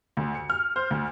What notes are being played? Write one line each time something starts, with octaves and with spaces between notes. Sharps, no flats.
D2
C#7
F6
C5
D2